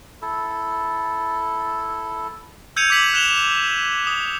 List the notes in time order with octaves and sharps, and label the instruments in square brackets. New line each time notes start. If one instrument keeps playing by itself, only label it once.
[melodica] E4 A4
[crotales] E6 G6 G#6 C#7 D#7 F7
D6 G6 B6 F#7
F#6 E7 F7 G7
D#6